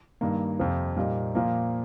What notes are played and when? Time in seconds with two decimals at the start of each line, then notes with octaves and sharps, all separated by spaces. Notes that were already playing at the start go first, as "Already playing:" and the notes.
0.21 G2 D#3 A#3
0.59 F2 C3 F3
0.97 A#2 G3 A#3 D#4
1.35 A#2 F3 A#3